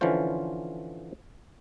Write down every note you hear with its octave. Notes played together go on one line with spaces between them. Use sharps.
D3 E3 F3 C#4 F4 C5